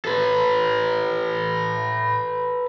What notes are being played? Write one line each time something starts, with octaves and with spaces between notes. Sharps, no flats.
A4 B4